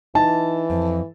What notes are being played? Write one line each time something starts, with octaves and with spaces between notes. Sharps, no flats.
E3 D#4 A5
F2